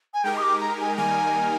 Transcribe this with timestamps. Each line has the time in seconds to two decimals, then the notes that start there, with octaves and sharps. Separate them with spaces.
0.14 G#5
0.24 G#3 D#4 G4 A#4 G5
0.37 D#6
0.42 D6
0.60 A#5
0.80 G#5
0.97 D#3 G3 A#3 D#4 A#4 G#5